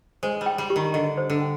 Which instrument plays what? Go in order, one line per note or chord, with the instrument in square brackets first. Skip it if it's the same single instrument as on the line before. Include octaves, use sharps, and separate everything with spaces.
[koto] G#3 [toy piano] C5
[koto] G3
[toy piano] G5
[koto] G3
[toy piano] G4
[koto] D#3
[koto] D3 [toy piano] D#5
[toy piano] C5
[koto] D3
[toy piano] G5